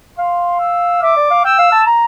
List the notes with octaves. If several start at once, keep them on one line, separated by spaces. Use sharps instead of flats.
F5 C6
E6
E5 D6
D5
F5
G5 E6
F5
A5
A#5